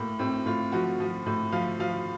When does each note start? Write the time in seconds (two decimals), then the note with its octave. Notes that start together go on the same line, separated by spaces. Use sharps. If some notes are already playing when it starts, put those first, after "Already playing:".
Already playing: A2 A#3
0.19 A2 C4
0.46 A2 F4
0.72 F3 F#4
1.00 F3
1.26 A2
1.52 F3 F5
1.80 F3 F5